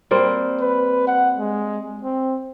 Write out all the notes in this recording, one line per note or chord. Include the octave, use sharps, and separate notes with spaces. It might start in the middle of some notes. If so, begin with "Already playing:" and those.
G3 A#3 C4
B4
F#5
G#3
C4